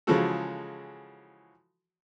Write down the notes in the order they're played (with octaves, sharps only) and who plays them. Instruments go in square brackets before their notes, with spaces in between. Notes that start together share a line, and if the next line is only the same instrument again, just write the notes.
[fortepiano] C#3 E3 F3 G#3 F#4 A4